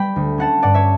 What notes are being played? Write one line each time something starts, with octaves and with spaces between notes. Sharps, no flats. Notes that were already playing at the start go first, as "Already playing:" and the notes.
Already playing: G3 G5 B5
D2
C#4 F#5 A5
G2 D5 F#5
C#5 E5